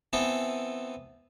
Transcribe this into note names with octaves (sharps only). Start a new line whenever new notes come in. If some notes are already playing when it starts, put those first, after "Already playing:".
E3 B3 C4 A4